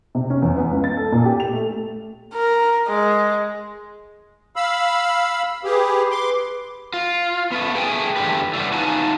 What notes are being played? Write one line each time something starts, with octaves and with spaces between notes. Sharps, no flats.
C3
C#4
E2
B3
C#2
A6
A4
A#2
G4
F7
A3
A#4
G#3
F5 B5 E6
G4 G#4 B4
C6 D6
F4
A3 B3
A3 G#4 G5 G#5
E2 D3 F3 G4 B4
E3 G3 A3 B3
D#4 F4 F#4 G#5 A5